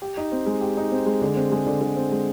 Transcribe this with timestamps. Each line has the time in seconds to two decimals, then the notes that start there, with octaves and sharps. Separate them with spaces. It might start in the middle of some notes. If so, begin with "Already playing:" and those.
0.02 G4
0.17 D#4
0.32 C4
0.46 G#3
0.61 G4
0.77 D#4
0.92 C4
1.06 G#3
1.22 D3
1.36 C4
1.52 G#3
1.66 D3
1.81 D3
1.96 C4
2.12 G#3